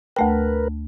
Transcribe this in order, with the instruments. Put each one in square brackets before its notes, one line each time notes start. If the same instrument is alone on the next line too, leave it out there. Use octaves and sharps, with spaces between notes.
[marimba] D2 A3 G5 [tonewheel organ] A#4 B4